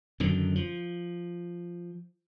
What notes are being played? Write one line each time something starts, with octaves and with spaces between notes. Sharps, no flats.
F#2 D3 D#3
F3